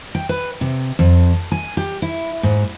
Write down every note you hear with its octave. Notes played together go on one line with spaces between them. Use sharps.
G5
B4
C3
F2
G#5
G4
E4
G#2